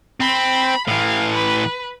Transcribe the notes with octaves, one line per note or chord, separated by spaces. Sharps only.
C4 B5
A2 E3 F5
B4